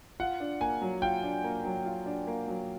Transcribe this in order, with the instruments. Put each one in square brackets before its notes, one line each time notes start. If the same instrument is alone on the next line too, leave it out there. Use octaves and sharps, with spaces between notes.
[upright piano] F4 [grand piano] F#5
[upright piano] D4
[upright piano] A#3 [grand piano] G#5
[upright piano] F#3
[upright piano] F4 [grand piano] G5
[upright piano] D4
A#3
F#3
F4
D4
A#3
F#3